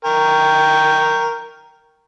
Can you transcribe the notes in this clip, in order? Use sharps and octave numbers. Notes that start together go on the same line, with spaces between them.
A#4 G5 C#6